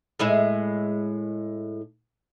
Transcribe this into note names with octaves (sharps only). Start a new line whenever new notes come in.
A2 G#3 E4